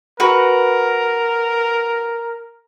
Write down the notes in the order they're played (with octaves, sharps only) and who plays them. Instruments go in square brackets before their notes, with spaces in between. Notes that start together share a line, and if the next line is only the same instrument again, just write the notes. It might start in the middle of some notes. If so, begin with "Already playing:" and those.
[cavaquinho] F#4 B4 [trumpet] A#4